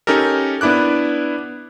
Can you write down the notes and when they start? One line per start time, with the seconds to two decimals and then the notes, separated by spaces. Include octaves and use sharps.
0.07 C#4 D#4 G4 A4 A#4
0.61 B3 D4 E4 D6 F#6